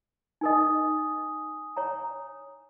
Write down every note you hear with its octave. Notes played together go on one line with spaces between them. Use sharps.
D#4 A#4 D#5 G#5 D#6
C#5 A#5